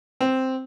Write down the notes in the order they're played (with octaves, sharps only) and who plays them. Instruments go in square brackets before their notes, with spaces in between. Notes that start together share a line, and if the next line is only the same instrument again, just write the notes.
[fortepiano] C4